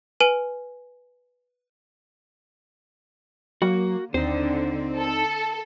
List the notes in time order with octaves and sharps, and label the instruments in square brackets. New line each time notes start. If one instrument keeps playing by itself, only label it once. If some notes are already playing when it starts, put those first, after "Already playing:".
[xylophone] B4 G#5 D#7
[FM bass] F#3 [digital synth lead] A#3 [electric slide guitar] F#4
[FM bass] D#2 [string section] D3 [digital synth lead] C4 [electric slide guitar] D#4 C5
[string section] A4